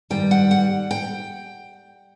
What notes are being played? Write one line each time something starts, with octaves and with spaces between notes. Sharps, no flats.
G2 D#3 G3 G5
F#5
F#5
G5